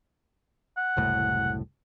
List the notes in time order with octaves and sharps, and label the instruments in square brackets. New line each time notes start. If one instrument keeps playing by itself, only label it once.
[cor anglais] F#5
[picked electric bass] F#1 C2 A2